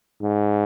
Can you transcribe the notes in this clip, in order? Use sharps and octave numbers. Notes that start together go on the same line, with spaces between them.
G#2